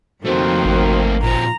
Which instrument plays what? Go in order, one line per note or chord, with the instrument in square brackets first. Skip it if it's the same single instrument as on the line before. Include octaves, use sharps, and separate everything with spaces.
[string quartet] F2 D#3 A#3 [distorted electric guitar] A3 C4 [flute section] F#4 C5
[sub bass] G#1
[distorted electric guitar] A#2 C4 [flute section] F4 [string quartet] A#5